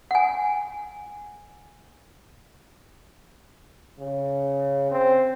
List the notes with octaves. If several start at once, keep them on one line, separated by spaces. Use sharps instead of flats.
F#5 G#5
C#3
C4